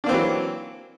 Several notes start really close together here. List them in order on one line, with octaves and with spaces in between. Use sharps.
D4 A#3 C4 E3 F#3